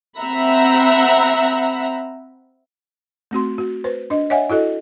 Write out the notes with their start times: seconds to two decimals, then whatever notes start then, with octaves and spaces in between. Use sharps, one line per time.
0.18 C4 E5 F#5 A#5 B5
3.31 A3 C4 F#4 C6
3.58 F#4
3.84 B4 C5
4.10 D4 D#5
4.30 C#5 D#5 E5 F#5 G#5
4.49 E4 F#4 A4 D#5